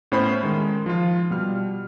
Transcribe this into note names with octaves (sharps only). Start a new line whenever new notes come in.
A2 B3 C#4 C5 B5
D#3 G#3
F3 F4
B2 G3 F6